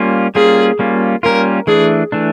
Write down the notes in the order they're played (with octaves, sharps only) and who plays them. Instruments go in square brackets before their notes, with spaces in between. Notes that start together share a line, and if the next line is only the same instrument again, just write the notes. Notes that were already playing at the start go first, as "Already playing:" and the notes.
Already playing: [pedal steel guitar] G3 A#3 C#4 F4
[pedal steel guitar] G3 A#3 C#4 F4 [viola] G#4
[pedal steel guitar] G3 A#3 C#4 F4
[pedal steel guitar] G3 A#3 C#4 F4 [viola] A#4
[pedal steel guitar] E3 A3 D4 [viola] G#4
[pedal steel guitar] E3 A3 D4